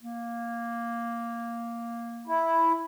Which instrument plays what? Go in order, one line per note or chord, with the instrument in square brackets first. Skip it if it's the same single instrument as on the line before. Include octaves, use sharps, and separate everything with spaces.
[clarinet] A#3
[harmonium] E4